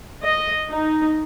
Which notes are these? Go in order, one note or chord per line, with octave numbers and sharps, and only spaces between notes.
D#5
D#4